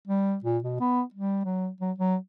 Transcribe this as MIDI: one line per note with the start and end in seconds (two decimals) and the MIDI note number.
0.08 0.36 55
0.45 0.58 46
0.64 0.75 47
0.80 1.02 59
1.14 1.45 55
1.45 1.69 54
1.81 1.92 54
1.98 2.16 54